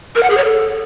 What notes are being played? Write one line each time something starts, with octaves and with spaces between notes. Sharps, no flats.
A#4
F#5
G#4
C#5
A4